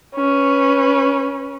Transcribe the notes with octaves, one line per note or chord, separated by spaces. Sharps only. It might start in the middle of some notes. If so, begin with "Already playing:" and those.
C#4 B4